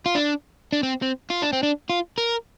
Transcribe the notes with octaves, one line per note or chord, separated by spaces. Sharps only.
F4
D4
D4
C4
C4
F4
D4
C4
D4
F4
A#4